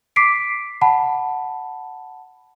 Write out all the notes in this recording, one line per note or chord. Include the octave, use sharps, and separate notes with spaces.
D6 B6 C7 D7
F#5 A5 B5